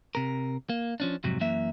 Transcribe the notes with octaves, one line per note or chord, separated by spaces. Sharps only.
C3 A#4
A#3
F3 C#4 D4
F2 G#2 C3 F#3
F#2 E3 A#3 E5